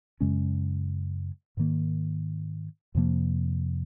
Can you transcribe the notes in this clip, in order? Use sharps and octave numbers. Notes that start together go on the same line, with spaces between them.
F#2 C#3 G#3 C#4
G#2 D#3 A#3
F2 C3 F3 A#3